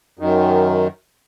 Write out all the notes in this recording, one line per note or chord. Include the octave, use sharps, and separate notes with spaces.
F#2 D#3